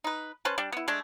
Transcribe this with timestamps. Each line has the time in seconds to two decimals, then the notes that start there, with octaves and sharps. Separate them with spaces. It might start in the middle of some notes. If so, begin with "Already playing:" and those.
0.04 D#4 B4
0.45 C#4 B4 C5 A5
0.58 G3 D4
0.72 B3 E4
0.88 G#3 A3 D4